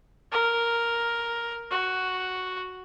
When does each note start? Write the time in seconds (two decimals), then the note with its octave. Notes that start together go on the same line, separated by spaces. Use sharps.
0.32 A#4
1.71 F#4